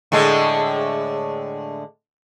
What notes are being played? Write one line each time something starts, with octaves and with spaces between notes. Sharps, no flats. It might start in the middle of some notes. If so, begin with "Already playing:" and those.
A2 D3 G#3